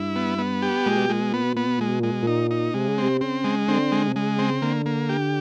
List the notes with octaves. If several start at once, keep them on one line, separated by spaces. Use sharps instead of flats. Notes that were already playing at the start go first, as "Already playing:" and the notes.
Already playing: G2 E4
B3
B3
G4
A#2 G#3
B2
A#2 G#3
B2
A#2 B3
B2
A#2 B3
B2
A#2 G#3
B2
A#2 G#3
B2
A#2 D#4
D#4
C3 G#3
C#3
C3 C4
C#3 C4
G#3
D3 C4
G#3
C3
C#3 G#3
C4
D3 A#3
A#3
G4